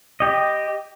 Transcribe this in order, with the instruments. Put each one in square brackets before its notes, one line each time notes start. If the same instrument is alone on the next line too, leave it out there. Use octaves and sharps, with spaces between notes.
[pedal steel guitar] G4 D#5